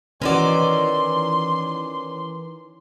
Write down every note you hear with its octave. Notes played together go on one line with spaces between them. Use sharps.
D#3 E3 C#4 F#4 D5 C6